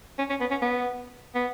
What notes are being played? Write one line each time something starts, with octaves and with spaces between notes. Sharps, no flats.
C#4
C#4
B3
C#4
B3
B3